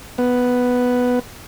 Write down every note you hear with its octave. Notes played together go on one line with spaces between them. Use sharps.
B3